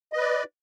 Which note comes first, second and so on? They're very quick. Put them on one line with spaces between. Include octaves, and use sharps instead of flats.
D#5 B4 D5